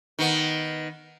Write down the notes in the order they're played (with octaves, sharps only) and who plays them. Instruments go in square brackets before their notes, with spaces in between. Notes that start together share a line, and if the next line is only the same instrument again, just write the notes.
[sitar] D#3 B3